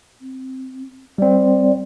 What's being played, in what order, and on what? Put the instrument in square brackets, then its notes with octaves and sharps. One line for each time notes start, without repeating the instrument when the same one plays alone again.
[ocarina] C4
[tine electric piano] G3 C4 [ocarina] D5